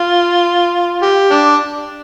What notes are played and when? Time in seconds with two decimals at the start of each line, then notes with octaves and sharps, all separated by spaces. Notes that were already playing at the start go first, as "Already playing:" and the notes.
Already playing: F4
1.03 G4
1.31 D4